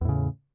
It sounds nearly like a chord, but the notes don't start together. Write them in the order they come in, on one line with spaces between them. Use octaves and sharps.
E2 A2 C#3